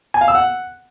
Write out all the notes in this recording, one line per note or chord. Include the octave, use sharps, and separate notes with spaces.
G#5
F5
E6
F#5